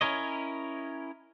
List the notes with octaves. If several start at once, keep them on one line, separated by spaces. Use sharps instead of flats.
C#4 E4 A#4 C#5 D#5